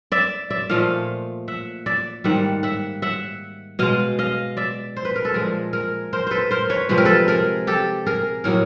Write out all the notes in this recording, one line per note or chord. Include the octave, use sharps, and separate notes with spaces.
D5 E5
D5 E5
A#2 F3 A3 D#5 F5
E5 F#5
D5 E5
G#2 D#3 G3 A#3 E5 F#5
E5 F#5
E5 F#5
B2 G#3 D#5 F5
D#5 F5
D5 E5
C5
B4
A#4
A4 B4
A#2 F3 G#3 G#4 A#4
G#4 A#4
A#4 C5
A4 B4 C5
A#4 C5
B4 C#5
C3 F3 G#3 B4
A#4
A4 B4
G#4 A#4
G4 A4
G#4 A#4
A2 F#3 A#3 G#4 A#4